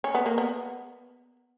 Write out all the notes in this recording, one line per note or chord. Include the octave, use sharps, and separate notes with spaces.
C#4
B3
A#3
B3